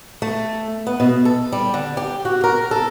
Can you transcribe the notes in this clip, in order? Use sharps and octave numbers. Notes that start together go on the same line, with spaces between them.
A3
B3
B2
A4
G3
D3
G4
F#4
A#4
A4